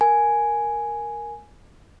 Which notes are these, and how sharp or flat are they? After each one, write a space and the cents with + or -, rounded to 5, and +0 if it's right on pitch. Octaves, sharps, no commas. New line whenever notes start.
A#4 +0 G#5 +5